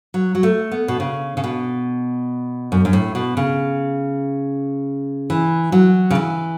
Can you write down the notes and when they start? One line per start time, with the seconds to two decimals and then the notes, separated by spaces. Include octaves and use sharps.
0.14 F#3
0.35 F#3
0.43 A3
0.72 B3
0.88 B2
1.00 C#3
1.37 C#3
1.44 B2
2.72 F#2
2.85 F#2
2.93 A2
3.15 B2
3.37 C#3
5.30 E3
5.72 F#3
6.11 C#3
6.15 E3